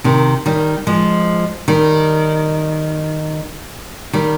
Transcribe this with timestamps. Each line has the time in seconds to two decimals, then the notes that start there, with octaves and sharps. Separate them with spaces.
0.04 C3 D#3
0.46 D#3 G3
0.87 F3 G#3
1.68 D#3 G3
4.13 D#3 G3